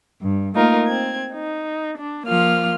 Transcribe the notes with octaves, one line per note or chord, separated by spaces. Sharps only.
G2
A3 A#3 D#4 F4 A#4
C4 G#6
D#4
D4
F3 A#3 F4 F6